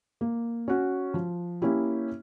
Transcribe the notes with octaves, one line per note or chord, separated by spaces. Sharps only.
A#3
C#4 F#4
F3
A#3 C#4 E4 G4